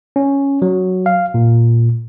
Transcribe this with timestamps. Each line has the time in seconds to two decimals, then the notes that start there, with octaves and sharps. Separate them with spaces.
0.16 C#4
0.62 F#3
1.06 F5
1.34 A#2